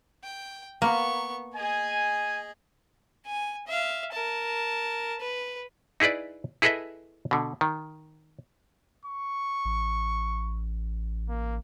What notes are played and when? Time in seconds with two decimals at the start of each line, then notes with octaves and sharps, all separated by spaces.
0.24 G5
0.82 A#3 B3 C#6
1.55 G#4 D#5 G#5
3.27 G#5
3.67 E5 F5
4.12 A#4 A5
5.20 B4
6.00 D#4 E4 G#4 B4 D5
6.62 E4 G#4 A4 B4 D#5 E5
7.31 B2 D3
7.61 D#3
9.05 C#6
9.65 A1
11.29 A#3